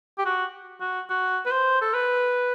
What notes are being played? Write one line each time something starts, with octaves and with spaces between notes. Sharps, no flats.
G4
F#4
F#4
F#4
B4
C5
A4
B4